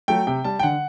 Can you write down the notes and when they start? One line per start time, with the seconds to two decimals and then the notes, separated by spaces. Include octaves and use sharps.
0.08 F#3 A3 G5
0.27 C3 G5
0.44 G3 A5
0.59 G5
0.63 D3 F#5